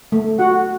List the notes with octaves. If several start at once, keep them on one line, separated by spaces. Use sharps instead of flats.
A3
F#4 F#5